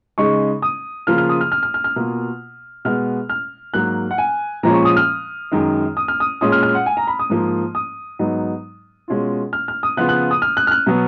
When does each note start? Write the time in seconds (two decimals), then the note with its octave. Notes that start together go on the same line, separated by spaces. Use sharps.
0.18 C#3 G#3 D#4 C#6
0.62 D#6
1.07 C#3 F3 A#3 F4 F6
1.18 F6
1.29 D#6
1.41 F6
1.52 F6
1.63 F6
1.74 F6
1.84 F6
1.96 B2 A#3 F4
2.85 B2 G#3 B3 F6
3.29 F6
3.74 G#2 F#3 A#3 F#6
4.11 F#5
4.18 G#5
4.63 A#2 F3 G#3 C#4 A#5
4.74 C#6
4.85 D#6
4.97 F6
5.52 F#2 D#3 G#3
5.97 D#6
6.08 F6
6.20 D#6
6.41 A#2 G#3 C#4 F4 D#6
6.52 F6
6.63 F6
6.75 F#5
6.86 G#5
6.97 A#5
7.07 B5
7.19 D#6
7.30 G#2 F3 A#3
7.75 D#6
8.19 G#2 F#3 B3 D#4
9.08 B2 G#3 C#4 F4
9.53 F6
9.68 F6
9.83 D#6
9.97 C#3 F3 B3 F4 F#6
10.09 F#6
10.31 D#6
10.42 F6
10.57 F#6
10.67 F6
10.71 F#6
10.86 B2 F#3 B3